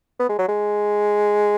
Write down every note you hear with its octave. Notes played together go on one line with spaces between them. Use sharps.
B3
G#3
F#3
G#3